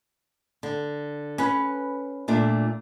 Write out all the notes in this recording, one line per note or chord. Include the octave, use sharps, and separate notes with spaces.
D3
C#4 B4
A#2 A3 D4 F4